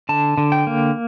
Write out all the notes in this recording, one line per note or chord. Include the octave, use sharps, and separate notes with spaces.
D3 A5
D3
G5
A#3